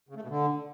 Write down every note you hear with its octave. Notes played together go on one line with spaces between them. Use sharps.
C#3
A3
B2
D3